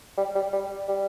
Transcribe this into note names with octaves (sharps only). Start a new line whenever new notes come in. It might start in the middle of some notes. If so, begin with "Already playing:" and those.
G3
G3
G3
G3